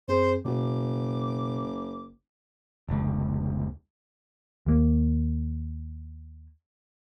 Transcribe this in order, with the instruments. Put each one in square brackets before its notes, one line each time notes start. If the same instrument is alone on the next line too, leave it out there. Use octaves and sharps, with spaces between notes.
[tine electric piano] F#2 C4 G#4 [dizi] C5
[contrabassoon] F#1 [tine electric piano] B2 F#4 [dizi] D6
[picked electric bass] F1 C#2
D#2 A#3